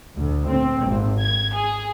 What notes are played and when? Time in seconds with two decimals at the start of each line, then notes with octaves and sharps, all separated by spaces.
0.16 D2
0.46 C4
0.87 G#1
1.20 G#6
1.55 G#4